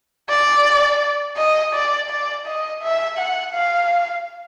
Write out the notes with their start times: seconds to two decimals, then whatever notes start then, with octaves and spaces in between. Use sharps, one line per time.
0.29 D5
1.37 D#5
1.74 D5
2.10 D5
2.46 D#5
2.82 E5
3.18 F#5
3.54 F5